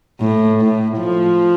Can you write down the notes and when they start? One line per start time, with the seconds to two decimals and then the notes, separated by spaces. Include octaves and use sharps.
0.21 A2
0.60 A2
0.98 F3